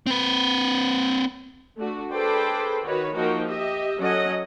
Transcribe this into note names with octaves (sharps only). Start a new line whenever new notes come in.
C4 B4
A3 D4 F#4
G#4 A4 B4 C5 D5 G5
D#3 F#4 B4 C#5
F3 A#3 D#4 F#4 A#4 G5
G4 D#5 E5
F#3 C#4 A4 D#5 F#5